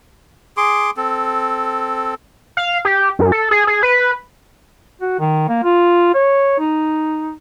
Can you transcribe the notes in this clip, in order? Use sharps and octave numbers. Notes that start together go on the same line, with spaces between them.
G#4 C6 D6
C4 A4
F5
G4
F#2
A4
G#4
G#4
B4
F#4
D#3
A#3
F4
C#5
D#4